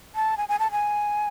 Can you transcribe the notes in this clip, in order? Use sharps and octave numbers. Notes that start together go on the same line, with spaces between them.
A5
G#5
G#5
A5
G#5